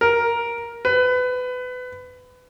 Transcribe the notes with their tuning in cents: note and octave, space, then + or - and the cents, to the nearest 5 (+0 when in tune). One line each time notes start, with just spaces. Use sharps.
A#4 +10
B4 +25